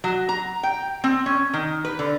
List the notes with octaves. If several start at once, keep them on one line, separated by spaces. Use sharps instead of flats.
F#3
A#5
G5
C4
C#4
D#3
B4
D3